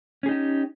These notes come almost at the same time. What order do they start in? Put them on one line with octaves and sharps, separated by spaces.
C#4 G#4 D#4 G4